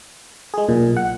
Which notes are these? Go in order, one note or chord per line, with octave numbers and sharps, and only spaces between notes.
G#3 G#4
B1 A#2
F#5